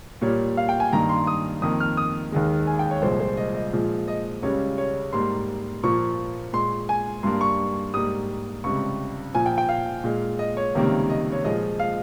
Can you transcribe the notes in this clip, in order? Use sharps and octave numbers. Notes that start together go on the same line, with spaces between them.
A#2 G3 A#3 C#5
F5
G5
G#5
G2 D#3 A#3 A#5
C6
D#6
F2 D#3 A#3 D#6
F6
D#6
D#2 D#3 G#3
G#5
G5
C#5
C2 A#2 F3 G#3 C5
C5
D#5
D#5
A#2 F3 G#3
D#5
C#2 C#3 G3 C#5
C#5
G#2 G3 A#3 C6
A#2 F3 A#3 C#6
A#2 G#3 C6
G#5
G2 G3 A#3 C6
C#6
G#2 G3 A#3 D#6
C#2 C3 G3 C#6
A#2 F3 A#3 G#5
G5
G5
F5
A#2 G#3
D#5
C#5
C#2 C3 D#3 G3 A#3
D#5
C#5
A#2 F3 G#3 D#5
F5